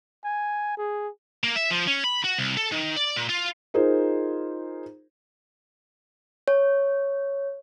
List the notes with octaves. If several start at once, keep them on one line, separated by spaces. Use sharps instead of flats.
G#5
G#4
A#3
E5
F3
C#4
B5
F#4
C2
A4
D#3
D5
A#2
F4
D#4 F4 G#4 A#4 C5
C#5